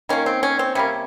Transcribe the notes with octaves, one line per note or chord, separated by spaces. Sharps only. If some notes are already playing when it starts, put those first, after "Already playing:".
D#3 A#3 C#4
C4
C#4
C4
C3 G3 A#3 C#4